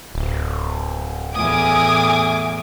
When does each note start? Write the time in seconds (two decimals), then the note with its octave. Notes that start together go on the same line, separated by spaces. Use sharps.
0.15 D1
1.35 E2 A2 G#5 D6 D#6